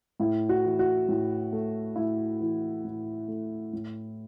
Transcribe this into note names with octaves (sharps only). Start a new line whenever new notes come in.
A2 E4
F#4
E3
F#4
A2
A3
A2 E4
E3
A2
A3
A2